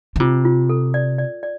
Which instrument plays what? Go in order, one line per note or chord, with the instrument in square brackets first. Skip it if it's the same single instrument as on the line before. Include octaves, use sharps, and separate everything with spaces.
[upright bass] D3
[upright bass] C3 [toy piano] F4
[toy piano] F4
A4
D5
D5
D5